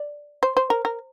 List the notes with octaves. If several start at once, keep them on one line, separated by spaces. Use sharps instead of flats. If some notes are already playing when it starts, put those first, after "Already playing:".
Already playing: D5
C5
C5
A#4
A#4